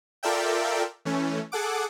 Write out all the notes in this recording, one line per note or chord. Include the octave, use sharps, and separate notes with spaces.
F4 A4 A#4 D5 E5 G5
E3 A3 C#4
G#4 A4 F#5 D6